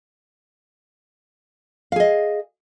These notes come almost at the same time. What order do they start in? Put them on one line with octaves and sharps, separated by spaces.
F5 G#4 D#5